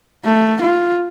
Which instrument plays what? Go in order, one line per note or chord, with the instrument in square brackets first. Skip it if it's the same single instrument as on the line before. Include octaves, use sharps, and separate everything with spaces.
[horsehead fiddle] A3
F4